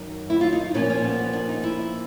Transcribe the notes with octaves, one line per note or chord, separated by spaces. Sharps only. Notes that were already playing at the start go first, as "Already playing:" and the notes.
Already playing: F#2 D#3 F#3
E4
F4
D#4
A#2 F3 C#4
C#4
B3
B3
D4
D#4
E4